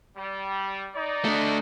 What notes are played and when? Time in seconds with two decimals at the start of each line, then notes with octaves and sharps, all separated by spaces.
0.17 G3
0.95 D#4 D5
1.25 A3 D4